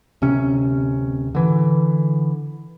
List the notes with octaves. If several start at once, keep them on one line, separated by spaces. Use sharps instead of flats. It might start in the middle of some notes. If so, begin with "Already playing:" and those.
D1 C3 C#4
D3 E3